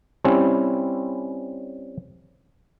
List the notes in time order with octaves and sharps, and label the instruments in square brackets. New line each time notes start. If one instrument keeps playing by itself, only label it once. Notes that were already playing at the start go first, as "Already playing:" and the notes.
[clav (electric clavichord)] G3 C4 C#4 E4